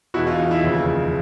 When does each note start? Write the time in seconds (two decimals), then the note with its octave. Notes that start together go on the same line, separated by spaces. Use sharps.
0.14 E1 E2 B2 E4 F#4
0.26 D#4 F4
0.38 D#4
0.51 E4
0.63 F1 D#2 C#3 F3